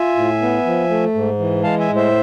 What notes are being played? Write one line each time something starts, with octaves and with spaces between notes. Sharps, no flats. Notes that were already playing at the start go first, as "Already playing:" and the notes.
Already playing: F4 E5 G#5
A2
B3
F3
A3
G#2
E3
G#3 F5 A5
E5 G#5
A2
C5 E5